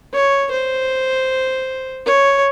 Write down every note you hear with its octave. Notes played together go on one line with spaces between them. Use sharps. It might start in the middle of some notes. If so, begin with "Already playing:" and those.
C#5
C5
C#5